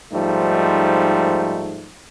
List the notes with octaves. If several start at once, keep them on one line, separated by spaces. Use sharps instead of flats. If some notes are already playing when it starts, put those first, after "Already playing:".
G#2 F3 G3 A3 D#4